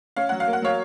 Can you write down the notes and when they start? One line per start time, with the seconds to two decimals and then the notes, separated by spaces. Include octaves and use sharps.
0.16 C#4 F5
0.29 F#3 F#5
0.40 F5
0.47 A#3
0.53 F#5
0.62 F#3 C#5 F5